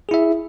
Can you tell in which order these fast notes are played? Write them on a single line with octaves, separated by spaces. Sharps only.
G#4 E4 E5